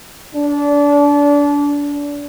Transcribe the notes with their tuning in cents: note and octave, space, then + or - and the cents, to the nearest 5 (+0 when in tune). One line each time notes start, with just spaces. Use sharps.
D4 -25